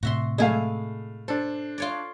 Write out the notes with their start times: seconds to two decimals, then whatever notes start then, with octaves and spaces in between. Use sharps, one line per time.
0.03 A2 C3 F#4 E5 C6
0.38 G#3 A3 E4 G#4 F5
1.28 D4 A4 C5
1.78 F4 C#5 D5